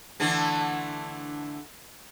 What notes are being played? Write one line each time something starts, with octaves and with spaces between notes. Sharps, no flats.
D3 E3 A3